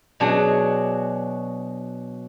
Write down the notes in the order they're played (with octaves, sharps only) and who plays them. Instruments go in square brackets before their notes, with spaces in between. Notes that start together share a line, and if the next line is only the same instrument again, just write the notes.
[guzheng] B2 F#3 D4 G#4